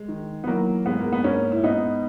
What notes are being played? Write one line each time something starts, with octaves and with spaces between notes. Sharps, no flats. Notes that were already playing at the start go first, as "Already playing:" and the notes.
Already playing: G#3
D#3
B3
E3 F#3 A#3
G#2 G#3 B3
A#3
B3
G#2 A#3 C#4
E4
G#2 B3 D#4